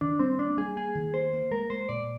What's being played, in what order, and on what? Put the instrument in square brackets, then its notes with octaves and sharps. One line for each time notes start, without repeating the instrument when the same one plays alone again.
[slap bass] D#3 [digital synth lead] D4
[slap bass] G3 [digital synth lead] C4
[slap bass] A#3 [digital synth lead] D4
[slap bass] G3 [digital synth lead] G#4
[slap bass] A#3 [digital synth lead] G#4
[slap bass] D#3
[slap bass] A#3 [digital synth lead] C5
[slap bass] A#3
[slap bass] G#3 [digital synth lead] A#4
[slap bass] G#3 [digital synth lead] C5
[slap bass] A#2 [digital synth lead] D5